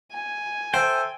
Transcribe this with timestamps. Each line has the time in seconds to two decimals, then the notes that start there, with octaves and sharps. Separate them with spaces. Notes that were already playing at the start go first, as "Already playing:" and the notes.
0.13 G#5
0.74 A4 C5 E5 G5